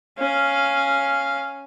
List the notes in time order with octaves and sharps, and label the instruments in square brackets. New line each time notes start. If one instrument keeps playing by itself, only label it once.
[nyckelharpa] C#4 F5